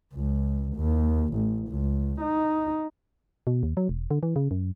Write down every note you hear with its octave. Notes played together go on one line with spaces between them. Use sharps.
C#2
D#2
A1
C#2
D#4
B2
D#2
F#3
E1
D3
E3
C#3
F#2